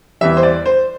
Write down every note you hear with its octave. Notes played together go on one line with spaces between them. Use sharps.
E2 E3 G3 E5
C5
D5
C5